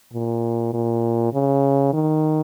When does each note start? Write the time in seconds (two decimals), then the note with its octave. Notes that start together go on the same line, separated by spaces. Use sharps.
0.13 A#2
0.73 A#2
1.33 C#3
1.93 D#3